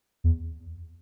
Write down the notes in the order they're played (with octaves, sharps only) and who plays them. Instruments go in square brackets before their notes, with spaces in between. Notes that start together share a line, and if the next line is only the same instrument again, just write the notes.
[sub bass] E2